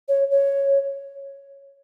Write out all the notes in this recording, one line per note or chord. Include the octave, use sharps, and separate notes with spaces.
C#5
C#5